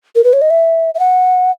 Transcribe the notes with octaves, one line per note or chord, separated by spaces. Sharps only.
A#4
B4
C#5
D#5
E5
E5
F#5